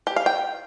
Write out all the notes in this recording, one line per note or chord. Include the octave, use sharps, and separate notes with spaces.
G4
F5
G5